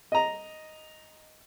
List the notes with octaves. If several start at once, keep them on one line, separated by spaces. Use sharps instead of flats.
D#5 A#5